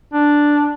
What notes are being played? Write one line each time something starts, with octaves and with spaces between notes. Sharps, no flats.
D4